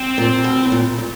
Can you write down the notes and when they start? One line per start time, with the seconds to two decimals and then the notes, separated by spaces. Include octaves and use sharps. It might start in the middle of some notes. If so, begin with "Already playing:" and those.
Already playing: C4
0.18 A#2
0.44 B2
0.63 A2
0.72 A#2
0.98 A#2